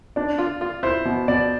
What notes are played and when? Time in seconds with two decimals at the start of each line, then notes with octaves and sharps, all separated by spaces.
0.16 D4 D5
0.38 F4
0.61 F4
0.83 E4 C5
1.05 B2
1.28 B2 D5